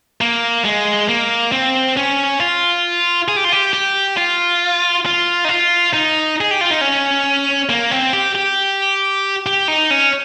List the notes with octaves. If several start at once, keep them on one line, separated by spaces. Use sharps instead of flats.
A#3
G#3
A#3
C4
C#4
F4
G#4
G4
F4
G4
G4
F4
F4
D#4
F4
D#4
G#4
G4
F4
D#4
C#4
A#3
C4
G4
G4
G4
D#4
C#4